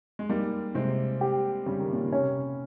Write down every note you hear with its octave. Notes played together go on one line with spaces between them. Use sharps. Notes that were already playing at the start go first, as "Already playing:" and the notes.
G#3
G3 A#3 D#4
C3 G#3 C4
G4
C#3 G3
D#3
A#2 C#3
C3 C#4